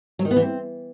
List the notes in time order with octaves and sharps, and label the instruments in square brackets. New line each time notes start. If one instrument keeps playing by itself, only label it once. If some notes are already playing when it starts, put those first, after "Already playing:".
[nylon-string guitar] F#3
D#3
B3
E3
C4